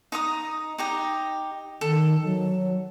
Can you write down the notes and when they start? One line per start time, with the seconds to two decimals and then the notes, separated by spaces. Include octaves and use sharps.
0.12 D#4 A#5 D#6
0.78 D#4 G4 A#5
1.81 D#3 A4
2.24 F#3